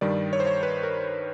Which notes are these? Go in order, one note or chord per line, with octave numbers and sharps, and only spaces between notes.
G2 D#3 G3 D5
C#5
C5
C#5
B4
A#4